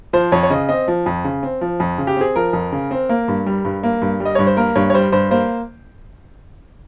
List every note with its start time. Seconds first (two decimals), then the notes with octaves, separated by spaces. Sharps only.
0.13 F3 C5
0.32 F2 C#5
0.43 C#5
0.50 C#3 D#5
0.69 C4 D#5
0.88 F3
1.06 F2
1.24 C#3
1.43 C4
1.61 F3
1.80 F2
1.98 C#3
2.07 G4
2.17 C4 G#4
2.36 F3 A#4
2.53 F2
2.72 C#3
2.91 C4
3.09 A#3
3.28 G2
3.46 G3
3.65 G2
3.83 A#3
4.02 G2
4.20 G3
4.25 D#5
4.35 G2 C#5
4.47 C5
4.57 A#3 A#4
4.75 G2 C#5
4.90 C#5
4.94 G3 C5
5.12 G2 C5
5.31 A#3 C5